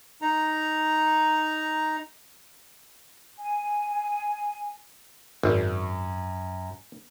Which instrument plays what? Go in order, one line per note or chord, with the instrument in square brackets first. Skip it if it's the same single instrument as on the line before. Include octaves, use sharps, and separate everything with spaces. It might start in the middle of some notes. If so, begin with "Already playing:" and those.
[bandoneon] D#4 A#5
[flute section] G#5
[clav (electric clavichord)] G#1 [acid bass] F#2